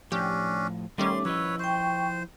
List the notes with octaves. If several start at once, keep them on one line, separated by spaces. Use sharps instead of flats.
A2 F3 C#4 D4 G4
D#3 G3 A3 C#4 C6 D6
F3 E4 B4 C#5 D#5 E6
C5 G5 C#6